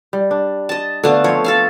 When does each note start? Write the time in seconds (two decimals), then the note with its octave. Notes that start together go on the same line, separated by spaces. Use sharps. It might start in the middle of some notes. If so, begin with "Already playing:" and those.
0.13 G3
0.31 D4
0.69 D#5 A5
1.04 D3 A3 B3 F5
1.24 F3 C4 C#5
1.44 A4 E5 F5